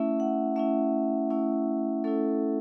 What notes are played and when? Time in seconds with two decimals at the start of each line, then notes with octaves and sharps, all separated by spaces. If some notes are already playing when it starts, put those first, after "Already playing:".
Already playing: A3 C#4 E4 E5
0.20 F#5
0.56 A3 C#4 E4 E5
1.30 A3 C#4 E4
2.04 A3 C#4 E4 A4